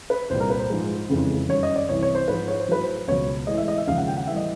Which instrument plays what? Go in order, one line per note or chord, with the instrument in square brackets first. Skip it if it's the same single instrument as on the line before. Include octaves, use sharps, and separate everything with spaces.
[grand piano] B4
C2 C5
A#2 G3
A#4
B4
C5
G#2 F3 G#3
F2 C#3 E3 G#3
F#2 D#3 G3 C#5
D#5
D5
C2 C3 E3 C#5
C#5
C5
G#2 F3 G#3 B4
C#5
C5
A2 F#3 B4
C5
C#2 B2 F#3 C#5
A2 E3 G#3 D#5
E5
D#5
E5
D#2 C#3 F3 G#3 F5
F#5
G5
F#5
A2 E3 G3 E5
D#5